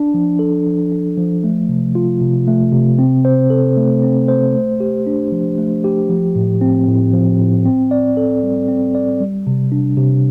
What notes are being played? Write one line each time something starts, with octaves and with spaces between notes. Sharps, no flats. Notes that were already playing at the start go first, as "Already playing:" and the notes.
Already playing: D4
F3
A4
F3
D4
F3
A3
C3
F4
C3
A3
C3
C4
C5
A4
A3
C4
C5
A3
G4
D4
F3
A3
G4
F3
A2
C4
A2
F3
A2
C4
D5
A4
G3
C4
D5
G3
C3
D4
C3